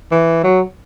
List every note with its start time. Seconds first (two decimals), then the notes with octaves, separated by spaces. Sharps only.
0.12 E3
0.44 F#3